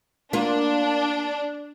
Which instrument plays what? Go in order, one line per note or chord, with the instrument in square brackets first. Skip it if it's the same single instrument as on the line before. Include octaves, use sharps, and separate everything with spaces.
[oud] A#3 F4 [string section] D4